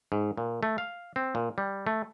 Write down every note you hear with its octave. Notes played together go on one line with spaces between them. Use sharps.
G#2
A#2
A3
F5
C4
A#2
G3
A3